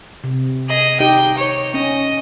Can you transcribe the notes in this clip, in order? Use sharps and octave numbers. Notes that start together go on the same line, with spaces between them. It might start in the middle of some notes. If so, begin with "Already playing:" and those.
C3
G#4 D#5
D#4 G4 D#5 G5
C#5
C#4 D#5